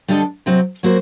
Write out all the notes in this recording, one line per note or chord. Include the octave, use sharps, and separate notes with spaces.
D3 G3 D4 A4 D#5
C3 F#3 C4
F#3 A#3 F#4 C5